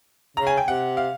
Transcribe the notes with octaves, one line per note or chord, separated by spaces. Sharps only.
C#3 A#5
G#5
G5
C3 F#5
F5